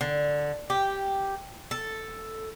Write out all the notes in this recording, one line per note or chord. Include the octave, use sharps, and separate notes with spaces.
D3
G4
A4